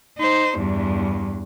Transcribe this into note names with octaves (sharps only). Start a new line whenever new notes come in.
D#4 C5
E2 G2